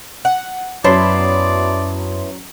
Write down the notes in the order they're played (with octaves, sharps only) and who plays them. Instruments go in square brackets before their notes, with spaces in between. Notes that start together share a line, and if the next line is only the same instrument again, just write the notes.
[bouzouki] F#5
[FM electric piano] F#2 A5 C6 [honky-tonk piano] F#3 C#4 [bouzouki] B3 E4 [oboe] D5